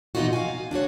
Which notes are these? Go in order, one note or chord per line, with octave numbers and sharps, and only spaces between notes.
B2 E3 F3 D#4 F4 F#4
F5 G#5
D4 F4 F#4 C#5